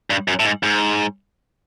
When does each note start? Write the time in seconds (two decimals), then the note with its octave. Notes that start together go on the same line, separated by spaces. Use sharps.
0.10 G2
0.28 F#2
0.40 A2
0.45 G#2
0.63 G#2